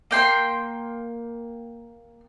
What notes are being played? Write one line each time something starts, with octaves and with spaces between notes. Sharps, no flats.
A#3 G5 C6